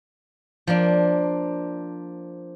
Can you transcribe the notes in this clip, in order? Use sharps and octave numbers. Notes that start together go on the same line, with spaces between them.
F3 A#3 D4